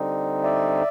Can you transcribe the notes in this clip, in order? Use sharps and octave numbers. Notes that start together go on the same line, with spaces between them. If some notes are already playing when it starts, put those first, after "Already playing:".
Already playing: D3 G3 C4 D#4
D5 E5